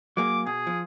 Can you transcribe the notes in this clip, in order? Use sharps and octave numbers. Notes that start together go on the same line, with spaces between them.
F#3 A#3 G#4 D6
B2 G#4
F3